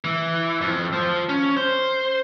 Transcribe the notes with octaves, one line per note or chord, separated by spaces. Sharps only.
E3
F2
F3 C5
C#4
C5